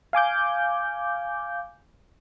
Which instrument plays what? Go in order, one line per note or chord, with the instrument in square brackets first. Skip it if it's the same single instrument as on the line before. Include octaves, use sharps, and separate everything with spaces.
[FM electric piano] F5 G#5 D6 G6